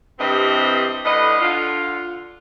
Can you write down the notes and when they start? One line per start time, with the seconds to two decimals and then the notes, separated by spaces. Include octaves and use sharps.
0.19 G2 C3 E3 C4 D#5
1.04 A2 D3 B4 D#5
1.40 D3 F4